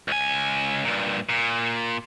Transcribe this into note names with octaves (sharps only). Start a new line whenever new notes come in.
C#2 G#5
G2 A#2
A#2